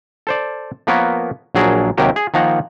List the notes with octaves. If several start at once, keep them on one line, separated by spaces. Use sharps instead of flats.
A4 C5 D5
F3 A#3 B3 A#4 B4 C#5
A#1 F#3 G#4 A#4 A5
D#2 C3 F#3 G4 A#4
G#4
D#3 F3 A#3 F#5 A#5